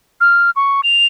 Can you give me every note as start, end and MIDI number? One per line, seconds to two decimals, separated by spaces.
0.21 0.50 89
0.56 0.81 85
0.83 1.07 101